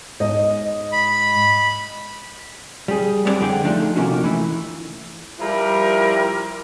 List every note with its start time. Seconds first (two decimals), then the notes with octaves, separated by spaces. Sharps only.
0.20 G#2 D#5
0.92 B5
2.88 G3 G#4
3.25 G3 B3 C4 D5 F#5
3.40 F2 D3 G#4 F#5 G5
3.64 F3 A3 D4 D#4
3.96 C3 D#3 A#3 C#4 F4 F#4
4.24 E3 A3 E4
5.39 F3 G3 E4 A#4